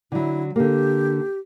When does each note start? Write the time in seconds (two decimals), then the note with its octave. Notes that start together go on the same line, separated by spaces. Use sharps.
0.12 D3 F#3 E4
0.56 D3 A#3 G4